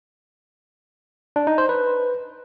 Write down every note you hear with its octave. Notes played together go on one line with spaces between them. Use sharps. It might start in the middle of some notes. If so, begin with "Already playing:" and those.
D4
D#4
C5
B4